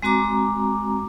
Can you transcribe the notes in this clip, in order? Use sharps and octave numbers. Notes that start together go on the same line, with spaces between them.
G#3 C4 F#4 A#5 D6